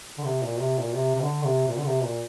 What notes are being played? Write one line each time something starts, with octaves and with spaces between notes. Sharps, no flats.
D3
C3
A#2
C3
A#2
C3
C3
D3
C3
A#2
D3
C3
A#2